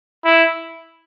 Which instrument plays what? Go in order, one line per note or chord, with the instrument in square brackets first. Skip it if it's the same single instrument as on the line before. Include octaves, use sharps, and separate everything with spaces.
[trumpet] E4